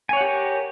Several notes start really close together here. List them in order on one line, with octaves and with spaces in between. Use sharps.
G#5 C#5 F#5 G4 A#4